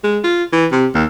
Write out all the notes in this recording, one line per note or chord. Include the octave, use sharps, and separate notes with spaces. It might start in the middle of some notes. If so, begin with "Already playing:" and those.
G#3
F4
E3
C3
D#2